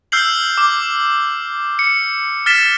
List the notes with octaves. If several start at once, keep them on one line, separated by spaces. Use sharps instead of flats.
E6 F6 G6 C7 F#7
D6
C#7
F6 A6 B6 E7